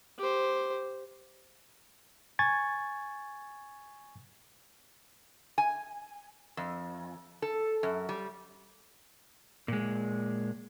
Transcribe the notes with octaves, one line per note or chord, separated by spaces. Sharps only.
G4 C5
G#5 C#6 G#6 A6
G#5
F2
A4
F#2
G3
A#2 G#3